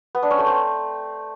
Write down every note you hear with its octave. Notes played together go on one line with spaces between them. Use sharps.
B3
D4
C#4
A3
C4